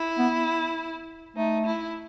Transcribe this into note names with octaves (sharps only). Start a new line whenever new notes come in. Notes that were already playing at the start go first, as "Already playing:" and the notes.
Already playing: E4
B3
A3 D#4
E4